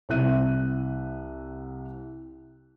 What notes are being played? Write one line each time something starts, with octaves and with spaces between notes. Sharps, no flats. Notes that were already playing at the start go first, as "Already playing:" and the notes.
C2 C3 E5 F#6 D#7